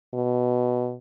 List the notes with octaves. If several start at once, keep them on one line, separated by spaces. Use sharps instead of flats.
B2